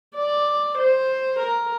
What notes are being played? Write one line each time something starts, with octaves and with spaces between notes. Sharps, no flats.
D5
C5
A#4